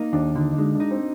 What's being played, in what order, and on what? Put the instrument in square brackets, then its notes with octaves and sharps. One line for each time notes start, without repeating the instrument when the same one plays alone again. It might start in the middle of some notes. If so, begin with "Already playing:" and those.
Already playing: [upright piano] A#3 [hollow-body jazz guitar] D#4
[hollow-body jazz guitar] D#2 [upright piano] D4
[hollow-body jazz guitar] D3 [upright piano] D#4
[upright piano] D#4
[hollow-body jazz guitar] G#3 [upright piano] D4
[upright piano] D4
[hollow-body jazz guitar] D#4
[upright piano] C4